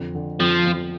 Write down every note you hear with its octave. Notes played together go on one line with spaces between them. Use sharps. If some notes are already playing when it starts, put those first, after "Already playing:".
Already playing: F2 D3
D3
F2 F3
F2